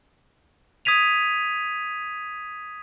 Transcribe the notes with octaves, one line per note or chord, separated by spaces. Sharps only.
D#6 G#6 B6 D#7 F7